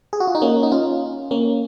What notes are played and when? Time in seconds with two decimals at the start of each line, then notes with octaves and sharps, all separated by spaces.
0.13 G#4
0.20 F#4
0.27 F4
0.35 D#4
0.42 A#3 C#4
0.63 D#4
0.72 C#4 F4
1.31 A#3 C#4